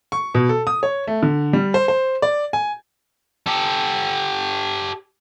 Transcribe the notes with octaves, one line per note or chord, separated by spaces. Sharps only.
C#6
B2
A4
D#6
C#5
A3
D3
G3
C5
C5
D5
G#5
G4 A4